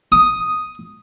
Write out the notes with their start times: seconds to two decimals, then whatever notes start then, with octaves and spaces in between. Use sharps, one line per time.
0.12 D#6